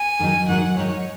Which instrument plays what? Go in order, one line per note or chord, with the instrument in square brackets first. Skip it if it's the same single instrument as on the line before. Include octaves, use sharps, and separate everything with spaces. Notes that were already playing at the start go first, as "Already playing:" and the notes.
Already playing: [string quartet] G#5
[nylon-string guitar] G#2 D#3 F#3 D#4
[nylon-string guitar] G#2 D#3 F#3 D#4 [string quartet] F#5
[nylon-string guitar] G#2 D#3 F#3 D#4 [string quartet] C#5